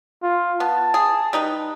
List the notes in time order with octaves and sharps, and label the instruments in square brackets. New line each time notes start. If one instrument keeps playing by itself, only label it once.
[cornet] F4
[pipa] B3 [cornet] A5
[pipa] G#4
G3 D#4 B4